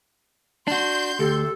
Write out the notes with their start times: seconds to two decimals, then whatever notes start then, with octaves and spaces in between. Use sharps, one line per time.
0.68 D4 F#4 C6 G6
1.19 D2 G4 A4